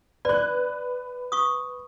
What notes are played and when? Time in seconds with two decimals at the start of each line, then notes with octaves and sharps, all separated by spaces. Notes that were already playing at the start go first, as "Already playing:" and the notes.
0.25 B4 D5 F#6
1.32 C#6 D#6